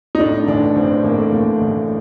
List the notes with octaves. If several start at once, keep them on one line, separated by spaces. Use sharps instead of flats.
D#4
A2 D4
A1 D4
A1 C4
A1 A#3
A3
A1 A#3
A1